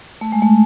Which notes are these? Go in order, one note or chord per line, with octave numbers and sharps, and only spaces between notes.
A3
G#3
A3